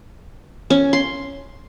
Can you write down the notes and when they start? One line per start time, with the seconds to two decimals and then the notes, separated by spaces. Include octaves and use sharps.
0.70 C#4
0.93 C6